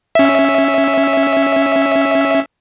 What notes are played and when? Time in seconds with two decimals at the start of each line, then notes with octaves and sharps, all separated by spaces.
0.15 C#4 E5